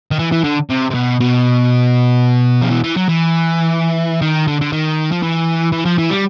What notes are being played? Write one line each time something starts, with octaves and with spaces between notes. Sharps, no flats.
D#3
E3
E3
D3
C3
C3
B2
B2
F3
E3
E3
F#3
E3
D#3
D3
D3
D#3
F3
E3
E3
F3
E3
G3